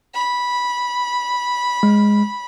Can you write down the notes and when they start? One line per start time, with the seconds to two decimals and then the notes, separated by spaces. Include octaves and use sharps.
0.14 B5
1.83 G#3